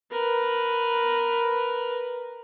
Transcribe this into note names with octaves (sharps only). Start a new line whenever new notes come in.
A#4 B4